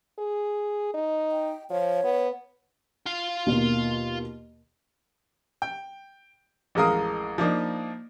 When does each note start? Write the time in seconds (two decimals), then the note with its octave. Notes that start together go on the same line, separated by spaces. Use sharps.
0.19 G#4
0.94 D#4
1.32 G5
1.70 F3 C#5
2.04 B3
3.06 F4 F5
3.46 D#2 B2 A#3
5.62 G5
6.75 A1 F2 G#3 A#4 F5 D#6
7.38 F3 A#3 D4 D#4